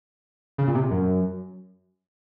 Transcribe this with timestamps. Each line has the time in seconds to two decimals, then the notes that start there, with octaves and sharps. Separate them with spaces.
0.58 C#3
0.67 A#2
0.75 C3
0.91 F#2